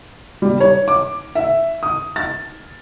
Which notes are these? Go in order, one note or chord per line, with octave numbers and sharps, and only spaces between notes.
G3
C#5
D6
E5
D#6
A6